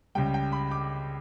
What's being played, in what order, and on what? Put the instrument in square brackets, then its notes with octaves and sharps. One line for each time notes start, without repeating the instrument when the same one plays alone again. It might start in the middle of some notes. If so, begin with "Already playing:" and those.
[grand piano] C#2 C#3 G3 G5
G5
B5
D6